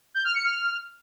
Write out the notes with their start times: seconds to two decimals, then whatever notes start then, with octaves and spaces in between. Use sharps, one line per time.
0.14 G6
0.24 F6
0.34 C#7
0.44 F6